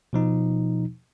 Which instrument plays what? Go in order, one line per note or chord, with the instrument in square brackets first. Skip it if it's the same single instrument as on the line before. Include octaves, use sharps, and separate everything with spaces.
[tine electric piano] B2 F3 D#4